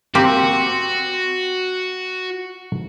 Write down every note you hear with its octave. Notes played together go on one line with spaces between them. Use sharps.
A#3 C4 F#4 G4